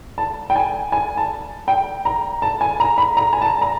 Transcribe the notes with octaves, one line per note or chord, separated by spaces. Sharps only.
A5
G5
G#5
G#5
A5
G5
A#5
A5
G#5
A#5
B5
A#5
G#5
A5
A#5